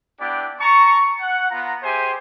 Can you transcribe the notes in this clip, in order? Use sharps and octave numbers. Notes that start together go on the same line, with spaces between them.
B3 D4 E4 G4 D5
A5 A#5 C#6
F#5
B3 F4 A#5
G4 G#4 C5 E5 G#5